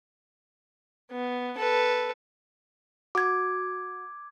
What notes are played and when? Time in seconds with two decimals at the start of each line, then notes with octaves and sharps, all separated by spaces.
1.11 B3
1.58 A4 B4
3.15 F#4 D6 G#6